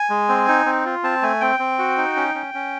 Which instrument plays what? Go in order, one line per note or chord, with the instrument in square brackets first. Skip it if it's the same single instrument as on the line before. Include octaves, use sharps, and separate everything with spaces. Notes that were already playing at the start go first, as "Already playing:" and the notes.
Already playing: [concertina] G#5
G#3
C4
D#4
C4
F4
C4 A5
A3 G#5
C4 G5
C4
F#4
D#4
C#4
C#4
C#4